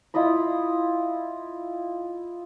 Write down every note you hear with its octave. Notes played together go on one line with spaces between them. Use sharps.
E4 F4 D#5 B5